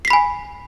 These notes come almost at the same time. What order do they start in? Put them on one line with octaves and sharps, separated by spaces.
C7 B6 B5 G#5